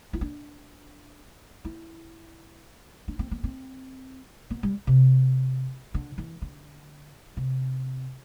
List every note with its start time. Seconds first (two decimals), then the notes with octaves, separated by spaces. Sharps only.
0.13 E4
0.21 D4
1.65 E4
3.08 D4
3.19 C4
3.31 B3
3.44 C4
4.50 B3
4.63 G3
4.87 C3
5.94 D3
6.18 E3
6.42 D3
7.37 C3